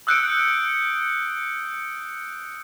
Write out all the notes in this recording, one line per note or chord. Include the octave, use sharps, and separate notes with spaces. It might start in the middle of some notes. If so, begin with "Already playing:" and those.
D#6 E6 F#6 G6 C#7 D7